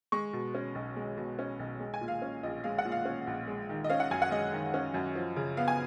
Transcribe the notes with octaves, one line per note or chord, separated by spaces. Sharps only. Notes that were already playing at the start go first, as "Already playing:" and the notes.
G#3 C#6
B2
C#4
B1
G#3
B2
C#4
B1
G#3
G#5
A#2
F5
C#4
A#1 D#5
G#3 F5
F#5
A#2
F5
C#4
A#1
G#3
D#3
D#5
C#4 F5
F#5
F#2 G#5
F#5
G#3 D#5
D#3
C#4
F#2
F3
C#3
B3 F5
G#5